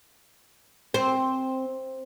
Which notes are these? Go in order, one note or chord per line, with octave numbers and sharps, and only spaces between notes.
C4